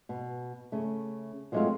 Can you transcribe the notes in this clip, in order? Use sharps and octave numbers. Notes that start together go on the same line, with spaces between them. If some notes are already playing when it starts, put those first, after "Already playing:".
B2
C#3 A3
F3 F#3 G#3 A3 C4 F4